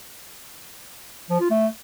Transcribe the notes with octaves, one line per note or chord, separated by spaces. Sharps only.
F3
F4
A3